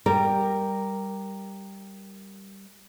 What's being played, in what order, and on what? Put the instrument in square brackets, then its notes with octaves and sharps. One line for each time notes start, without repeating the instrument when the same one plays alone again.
[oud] G3 [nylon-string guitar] A#4